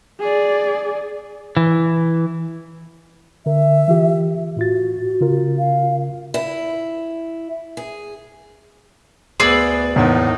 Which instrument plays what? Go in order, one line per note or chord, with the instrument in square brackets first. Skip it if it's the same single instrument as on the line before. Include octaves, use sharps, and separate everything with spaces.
[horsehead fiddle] G#4 D5
[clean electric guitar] E3
[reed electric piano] D3 A#4 [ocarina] E5
[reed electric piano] E3 F4 G4
[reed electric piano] A2 F4 A6 [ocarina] F#4
[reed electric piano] C#3 F4 A#4
[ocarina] F5
[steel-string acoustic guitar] E4
G#4
[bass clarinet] D2 [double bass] B3 [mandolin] G#4 D5 E6
[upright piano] E2 [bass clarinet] A2 [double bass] A#3 D#4